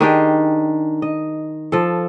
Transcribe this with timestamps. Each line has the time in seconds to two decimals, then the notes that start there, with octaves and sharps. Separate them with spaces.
0.01 D#3 D4 G4 G#4
1.02 D#5
1.72 F3 A4